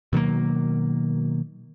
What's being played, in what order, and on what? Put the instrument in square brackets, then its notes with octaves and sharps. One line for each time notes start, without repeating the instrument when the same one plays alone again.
[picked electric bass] B2 D#3 F#3 A#3